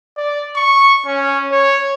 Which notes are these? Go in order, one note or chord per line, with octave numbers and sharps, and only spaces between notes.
D5
C#6
C#4
C#5